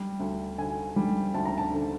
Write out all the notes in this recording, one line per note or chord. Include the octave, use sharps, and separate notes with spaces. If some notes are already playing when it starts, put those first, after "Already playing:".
Already playing: G3
D2
D3 G#5
G3
D2 A5
A#5
A5
D3